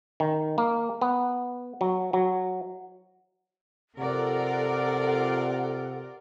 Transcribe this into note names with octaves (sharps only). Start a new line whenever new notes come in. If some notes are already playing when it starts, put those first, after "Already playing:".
D#3
A#3
B3
F#3
F#3
C3 F4 A4 A#4 D5 F#5